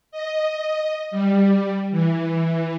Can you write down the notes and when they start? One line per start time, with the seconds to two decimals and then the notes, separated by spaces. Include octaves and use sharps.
0.11 D#5
1.11 G3
1.91 E3